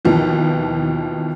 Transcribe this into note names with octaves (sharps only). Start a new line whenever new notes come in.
D#2 B2 E3 F3